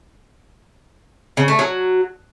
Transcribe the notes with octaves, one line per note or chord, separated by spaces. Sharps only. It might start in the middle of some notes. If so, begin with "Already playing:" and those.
C#3
A3
F#3